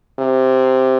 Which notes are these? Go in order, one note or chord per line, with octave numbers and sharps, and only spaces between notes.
C3